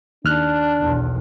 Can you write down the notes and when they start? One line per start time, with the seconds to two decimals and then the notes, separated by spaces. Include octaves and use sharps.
0.25 D#2 D4 F6 F#6
0.81 B1 E2